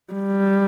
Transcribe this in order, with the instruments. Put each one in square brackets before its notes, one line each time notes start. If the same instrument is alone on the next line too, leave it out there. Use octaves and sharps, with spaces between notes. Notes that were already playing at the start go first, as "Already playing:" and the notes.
[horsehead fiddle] G3